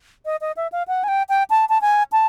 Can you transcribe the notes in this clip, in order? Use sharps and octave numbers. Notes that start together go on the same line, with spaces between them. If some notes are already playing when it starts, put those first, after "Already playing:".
D#5
D#5
E5
F5
F#5
G#5
G5
G5
A5
A5
G#5
A5